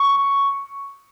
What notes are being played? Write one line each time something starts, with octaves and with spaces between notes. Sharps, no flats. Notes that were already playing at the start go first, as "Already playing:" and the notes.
Already playing: C#6